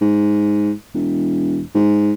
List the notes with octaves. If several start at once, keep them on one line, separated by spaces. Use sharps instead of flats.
G#2
E1
G#2